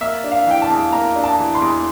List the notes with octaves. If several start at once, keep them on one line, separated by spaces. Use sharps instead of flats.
A#3 E5
D4
F5
E3 G5
A5
E2
A#3 A#5
D4
A5
E3
C6
E2